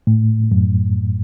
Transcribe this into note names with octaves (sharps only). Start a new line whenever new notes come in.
A2
F#2